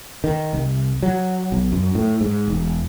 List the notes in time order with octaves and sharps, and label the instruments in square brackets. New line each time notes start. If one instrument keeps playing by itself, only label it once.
[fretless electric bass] D#3
C2
F#3
B1
F#2
A2
G#2
E1